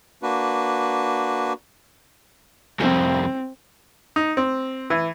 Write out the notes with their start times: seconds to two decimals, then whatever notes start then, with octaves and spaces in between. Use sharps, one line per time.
0.23 A#3 D4 F#4 B4
2.80 C2 F2 C4
4.16 D#4
4.37 C4
4.90 E3